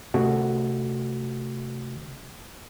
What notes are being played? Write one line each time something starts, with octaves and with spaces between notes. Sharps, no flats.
C3 A3 F#4